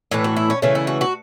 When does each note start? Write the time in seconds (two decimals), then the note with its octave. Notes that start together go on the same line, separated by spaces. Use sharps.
0.11 A2 E3 A3 B4
0.24 F#4
0.37 E4
0.50 C#4
0.62 C#3 E3 A3 C#4
0.75 E4
0.87 F#4
1.01 F#4